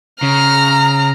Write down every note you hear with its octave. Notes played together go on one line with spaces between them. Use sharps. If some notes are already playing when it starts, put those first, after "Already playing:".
C#3 A#5 F6